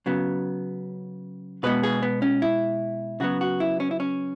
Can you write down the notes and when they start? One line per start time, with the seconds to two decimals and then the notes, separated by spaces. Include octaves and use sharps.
0.06 C#3 F#3 B3
1.63 B2 G#3 B3 B4
1.83 G#4
2.03 B3
2.22 C#4
2.42 E4
3.20 C#3 F#3 B3 F#4
3.41 F#4
3.60 E4
3.80 C#4
3.91 E4
4.00 C#4